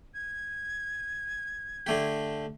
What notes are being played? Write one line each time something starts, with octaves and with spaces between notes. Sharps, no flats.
G#6
D3 A3 G4